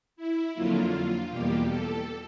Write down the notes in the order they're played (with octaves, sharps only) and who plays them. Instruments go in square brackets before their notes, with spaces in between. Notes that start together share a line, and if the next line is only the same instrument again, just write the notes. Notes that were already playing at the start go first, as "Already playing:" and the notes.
[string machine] E4
F2 D3 F#3 A#3 F4
E2 B2 G3 A#3 G4
A4